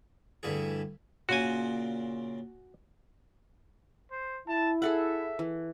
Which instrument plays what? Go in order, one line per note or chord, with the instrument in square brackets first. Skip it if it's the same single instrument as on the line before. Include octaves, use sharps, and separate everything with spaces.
[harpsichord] D2 G2 E3 G#4
[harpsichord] A#2 C#3 [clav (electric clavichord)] F#4 G#5
[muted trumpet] C5
[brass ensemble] E4 [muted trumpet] A5
[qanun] G#4 A4 F#5 [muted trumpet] E5
[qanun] E3